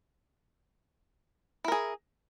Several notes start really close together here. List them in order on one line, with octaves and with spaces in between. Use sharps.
E4 A#4 G#4